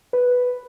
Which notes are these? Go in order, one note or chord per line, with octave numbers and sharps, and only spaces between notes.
B4